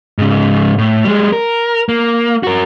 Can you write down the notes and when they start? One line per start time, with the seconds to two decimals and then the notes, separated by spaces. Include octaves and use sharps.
0.18 G#2 C#3
0.78 A2
1.04 G3 G#3
1.32 A#4
1.89 A#3
2.43 F#4 A#4